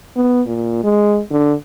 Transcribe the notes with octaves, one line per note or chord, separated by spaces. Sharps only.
B3
A#2
G#3
D3